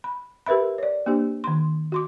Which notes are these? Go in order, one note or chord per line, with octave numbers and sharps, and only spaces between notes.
B5
G4 A#4 B4 E5 B5
C#5 D5
A#3 D4 G4 C5
D#3 C6
F#4 C6 D6